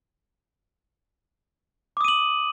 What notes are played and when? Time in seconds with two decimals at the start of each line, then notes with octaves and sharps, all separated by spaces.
1.97 D6
2.01 D#6
2.04 D#7
2.08 F#7